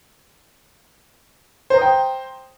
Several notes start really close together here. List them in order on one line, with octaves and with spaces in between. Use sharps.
C5 A#5 D#6 G5